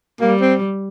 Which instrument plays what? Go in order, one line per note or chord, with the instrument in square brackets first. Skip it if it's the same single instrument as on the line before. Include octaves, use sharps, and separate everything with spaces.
[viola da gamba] G3 [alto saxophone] A#3
[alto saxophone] C4